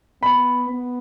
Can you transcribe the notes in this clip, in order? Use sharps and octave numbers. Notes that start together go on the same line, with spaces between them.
B3 B5
B3